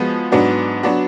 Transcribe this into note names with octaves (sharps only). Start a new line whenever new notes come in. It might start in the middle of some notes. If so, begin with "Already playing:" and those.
Already playing: F3 G#3 B3 F#4
G#2 F#3 B3 D4 F#4
F#3 B3 D4 F#4